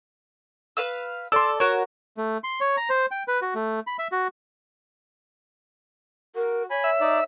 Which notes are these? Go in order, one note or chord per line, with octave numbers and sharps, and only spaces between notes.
B4 F5 E6
A4 D5 C6 E6
F#4 A#4 C#5
A3
C6
C#5
A#5
C5
G5
B4
F#4
A3
B5
E5
F#4
F#4 A#4
C#5 G#5 B5
E5
D#4 D5